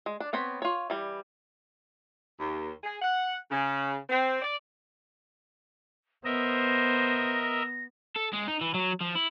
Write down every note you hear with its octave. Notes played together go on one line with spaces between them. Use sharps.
G#3
D4
B3 C4 C#5 B5
F4 C#5
E3 G3
D#2
G#4
F#5
C#3
C4
D5
B3 A#4 C5 D#5 E5 A#6
A4
G#3
D#4
E3
F#3
F3
E4